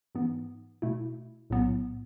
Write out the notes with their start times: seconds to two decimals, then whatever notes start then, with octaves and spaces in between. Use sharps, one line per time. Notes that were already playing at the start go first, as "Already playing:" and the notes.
0.15 G#2 E3 B3
0.82 B2 A3 E4
1.50 B1 A2 F#3 B3